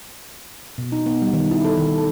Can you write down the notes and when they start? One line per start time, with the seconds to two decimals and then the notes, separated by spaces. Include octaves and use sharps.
0.78 B2
0.92 D#4
1.06 B3
1.22 G3
1.33 D#3
1.51 E4
1.64 A4
1.77 D#3
1.98 A4